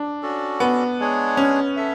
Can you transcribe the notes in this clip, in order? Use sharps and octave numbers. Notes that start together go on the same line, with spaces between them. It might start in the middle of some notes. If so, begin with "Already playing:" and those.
Already playing: D4
C#4 F#4 A4 D5
B3
G#3 D4 G#4 C#5
C#4
A4 E5